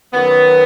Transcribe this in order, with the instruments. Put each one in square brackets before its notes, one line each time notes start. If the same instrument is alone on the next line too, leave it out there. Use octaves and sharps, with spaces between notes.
[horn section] F#2 D#3 F#3 B3